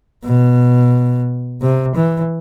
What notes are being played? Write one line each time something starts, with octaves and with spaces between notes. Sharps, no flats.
B2
C3
E3